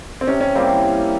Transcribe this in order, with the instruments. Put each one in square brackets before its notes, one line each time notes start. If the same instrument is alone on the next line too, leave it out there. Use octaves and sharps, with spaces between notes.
[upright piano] C4
[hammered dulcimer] C3 [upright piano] C#4
[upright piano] C#4
[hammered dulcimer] G3 A#3 E4 [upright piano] C4